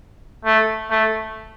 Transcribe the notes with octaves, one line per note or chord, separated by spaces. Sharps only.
A3
A3